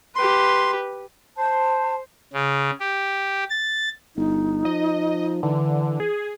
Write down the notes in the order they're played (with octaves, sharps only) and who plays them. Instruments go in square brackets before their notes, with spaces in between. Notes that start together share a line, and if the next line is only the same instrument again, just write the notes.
[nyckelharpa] G4 B4 [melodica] C6
[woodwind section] C5 [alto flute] A5
[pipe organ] C#3
G4
A6
[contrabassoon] G1 [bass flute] D#4
[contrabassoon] F3 [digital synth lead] D#5
[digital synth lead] D3 [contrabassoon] E3
[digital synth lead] G#4